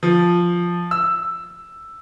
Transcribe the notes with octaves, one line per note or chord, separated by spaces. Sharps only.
F3
E6